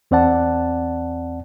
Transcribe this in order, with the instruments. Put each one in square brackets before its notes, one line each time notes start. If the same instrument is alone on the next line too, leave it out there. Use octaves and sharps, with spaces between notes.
[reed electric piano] E2 C4 D5 F#5 A5